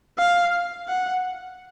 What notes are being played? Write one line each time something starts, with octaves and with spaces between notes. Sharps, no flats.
F5
F#5